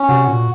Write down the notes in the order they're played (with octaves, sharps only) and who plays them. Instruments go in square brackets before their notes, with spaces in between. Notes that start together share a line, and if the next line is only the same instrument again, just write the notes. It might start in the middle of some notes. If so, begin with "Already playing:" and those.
Already playing: [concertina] C#4
[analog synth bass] C3 [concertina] F#4
[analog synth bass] A#2 [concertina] F#4